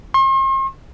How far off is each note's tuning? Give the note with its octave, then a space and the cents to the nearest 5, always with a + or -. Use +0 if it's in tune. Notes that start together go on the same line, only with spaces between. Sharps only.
C6 +45